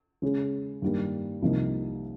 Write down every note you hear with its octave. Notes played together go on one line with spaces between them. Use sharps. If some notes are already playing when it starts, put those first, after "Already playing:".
C#3 G#3 C#4
G2 D#3 G3 A#3
C2 C3 F3 A#3 D#4